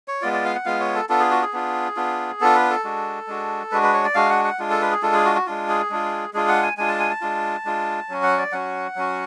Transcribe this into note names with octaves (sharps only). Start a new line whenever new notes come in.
C#5
G#3 B3 F4 D5
D5
F5
F#5
G#3 B3 F4 F5
C#5
A4
B3 D4 F4 A4
G#4
F#4
G#4
B3 D4 F4
B3 D4 F4
B3 D4 F4 A4
B4
A4
G#3 D4 F#4
G#3 D4 F#4
G#3 D4 F#4 B4
B4
C#5
D5
G#3 D4 F#4 F5
F#5
F#5
G#3 D4 F4
A4
B4
G#4
G#3 D4 F4 A4
G#4
F#4
F#4
G#3 D4 F4
G#4
G#3 D4 F4
G#3 D4 F4 G#4
F#5
G#5
G#3 D4 F4 G#5
A5
G#5
A5
G#3 D4 F4
G#3 D4 F4
F#3 C#4 F#4
F#5
D5
F#3 C#4 F#4 F#5
F#3 C#4 F#4